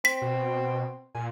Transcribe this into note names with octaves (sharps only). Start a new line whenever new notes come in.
C4 B6
B2
A#2 G#5